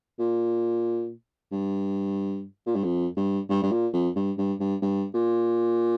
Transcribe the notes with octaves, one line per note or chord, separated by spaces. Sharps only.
A#2
G2
A#2
G2
F2
G2
G2
G2
A#2
F2
G2
G2
G2
G2
A#2